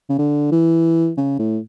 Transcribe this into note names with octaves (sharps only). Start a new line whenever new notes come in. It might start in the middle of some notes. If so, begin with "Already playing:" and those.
C#3
D3
E3
C#3
A2